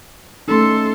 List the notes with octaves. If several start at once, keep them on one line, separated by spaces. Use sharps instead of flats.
A3 C#4 D#4 A4 C6